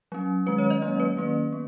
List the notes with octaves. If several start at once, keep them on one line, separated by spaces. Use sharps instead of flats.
F#3 C#4
D#3 G#3 C#4 B4
C#5
D#5
F#3 A#3 C#4 C#5
B4
D#3 A#3 C#4 B4
B3